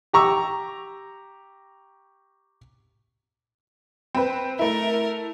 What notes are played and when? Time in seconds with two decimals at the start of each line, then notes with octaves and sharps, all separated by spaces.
0.13 G4 A#5 C#6 E6
4.15 C4 B4
4.59 A3 E4 A#4